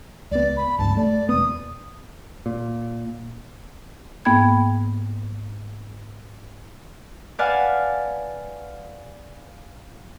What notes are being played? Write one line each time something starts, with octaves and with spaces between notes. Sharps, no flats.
C#2 B3 D5
B5
C#2 G2 A5
A3 D5
E1 B3 D#6
A#2
G#2 A#3 B3 G5 B5 G#6
B4 D5 F5 F#5 G#5 A5